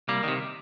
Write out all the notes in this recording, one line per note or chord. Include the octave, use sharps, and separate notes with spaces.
C2 G3 A#3
C3 D#3